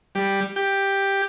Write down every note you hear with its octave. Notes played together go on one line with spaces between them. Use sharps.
G3
G4